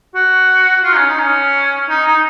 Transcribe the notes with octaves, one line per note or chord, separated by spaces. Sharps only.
F#4
F4
D#4
C#4
D#4
C#4
D#4
D#4